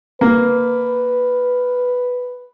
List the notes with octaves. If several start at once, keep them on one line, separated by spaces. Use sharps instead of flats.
A#3 B4